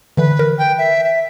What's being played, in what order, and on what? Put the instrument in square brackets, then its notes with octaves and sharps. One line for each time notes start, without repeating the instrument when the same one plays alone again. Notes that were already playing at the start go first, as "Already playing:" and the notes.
[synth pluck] D3 E3 [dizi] B4
[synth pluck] A#4
[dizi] G5
E5
E5